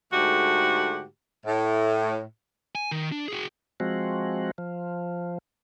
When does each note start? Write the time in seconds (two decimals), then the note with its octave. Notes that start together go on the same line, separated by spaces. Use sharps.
0.13 G#2 D3 A3 F#4 G4
1.46 A2
2.75 G#5
2.91 D#3
3.12 D4
3.28 F#4 G#4
3.80 F3 G#3 C4 F#4
4.58 F3